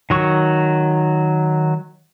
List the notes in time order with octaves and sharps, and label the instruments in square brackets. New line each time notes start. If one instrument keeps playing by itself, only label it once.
[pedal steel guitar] D#3 F#3 C#6